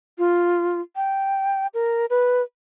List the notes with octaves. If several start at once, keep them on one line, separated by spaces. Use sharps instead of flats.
F4
G5
A#4
B4